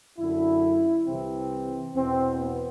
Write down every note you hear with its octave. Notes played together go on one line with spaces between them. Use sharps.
F#2 D3 E4
C2 C3 E3 C4
E2 B2 C4
B3